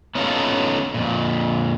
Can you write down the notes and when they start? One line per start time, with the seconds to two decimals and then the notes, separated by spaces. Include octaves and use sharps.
0.15 B3 C#4 D#4 F4 A4
0.94 F2 A#2